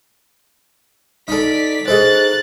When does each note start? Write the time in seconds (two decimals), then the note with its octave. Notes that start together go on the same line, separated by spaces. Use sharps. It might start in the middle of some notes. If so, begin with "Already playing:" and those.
1.28 D#4 A4 D5 B6
1.88 D#4 G#4 A4 C5 F#6 A6